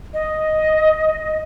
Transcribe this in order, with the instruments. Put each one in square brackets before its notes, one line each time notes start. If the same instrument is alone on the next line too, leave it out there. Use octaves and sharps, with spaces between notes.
[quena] D#5